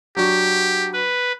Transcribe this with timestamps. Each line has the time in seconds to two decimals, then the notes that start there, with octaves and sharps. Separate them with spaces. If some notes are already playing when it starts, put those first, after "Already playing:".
0.16 F#3 D4 F#4 G4
0.93 B4